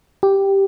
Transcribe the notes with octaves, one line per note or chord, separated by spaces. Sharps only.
G4